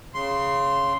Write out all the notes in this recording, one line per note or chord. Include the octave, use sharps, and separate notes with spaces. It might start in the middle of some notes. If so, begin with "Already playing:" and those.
C#3 C6